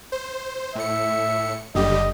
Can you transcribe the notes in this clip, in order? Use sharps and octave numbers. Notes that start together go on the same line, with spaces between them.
C5
A2 E5 C#7
F#1 D3 G3 G4 D#5